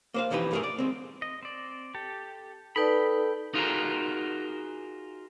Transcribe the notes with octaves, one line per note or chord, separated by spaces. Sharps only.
A#3 C5 F5
B1 F2 E3 D#4 G4 B4
B1 G2 A3 G4 G#4 A#4
D5
G#3 C4
D#5
C4 D5
G4 A4
D#4 A4 B4 D5 G5 B5
D#4 F4 F#4 G#4 A#4